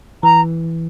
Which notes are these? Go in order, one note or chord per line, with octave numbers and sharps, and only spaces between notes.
E3 A#5